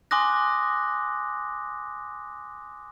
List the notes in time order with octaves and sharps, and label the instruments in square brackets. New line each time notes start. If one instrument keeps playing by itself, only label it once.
[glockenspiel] G#5 C6 D6 D#6 F#6 A#6